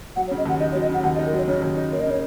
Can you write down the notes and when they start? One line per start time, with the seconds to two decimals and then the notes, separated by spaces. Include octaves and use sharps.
0.16 F#3 F#5
0.28 C#5
0.31 C#3
0.38 D#5
0.46 D#2 F#5
0.60 D#4 D#5
0.72 C#5
0.75 F#3
0.82 D#5
0.89 C#3 F#5
1.03 D#2 F#5
1.16 D#5
1.19 D#4
1.26 A#4
1.33 F#3 C#5
1.48 C#3 C#5
1.62 D#2
1.77 D#4
1.92 A#3 C#5
2.01 D#5
2.07 C#3 C#5